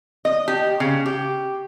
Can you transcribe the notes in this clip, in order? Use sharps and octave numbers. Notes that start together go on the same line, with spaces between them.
D#5
G4
C#3
G4